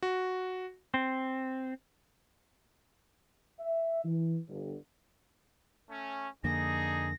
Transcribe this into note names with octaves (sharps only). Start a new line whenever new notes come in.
F#4
C4
E5
E3
G1
A3 C#4
F2 D3 A#3 D4 D#4 G#4 A#6